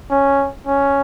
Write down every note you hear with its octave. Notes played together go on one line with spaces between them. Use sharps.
C#4
C#4